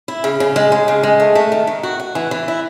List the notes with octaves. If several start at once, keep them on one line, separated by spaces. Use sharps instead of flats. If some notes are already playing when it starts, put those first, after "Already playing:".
E4
C#3
C#3
G#3
G#3
C#3
G#3
A3
A3
D#3
D#3
F#4
F#4
E3
E3
E4